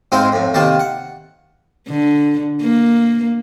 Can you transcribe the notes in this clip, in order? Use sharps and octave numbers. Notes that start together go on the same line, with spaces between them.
G#2 G#3 C4 D#4 E4 F5
F2 A2
C3 D#3 A#3 A5
F#5
D3
A#3